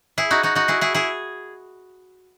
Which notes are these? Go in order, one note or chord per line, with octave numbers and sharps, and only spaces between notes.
E4 G#4
D#4 F#4
D#4 F#4
D#4 F#4
E4 G#4
E4 G#4
E4 G#4